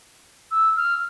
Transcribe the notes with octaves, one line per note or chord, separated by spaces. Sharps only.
E6
F6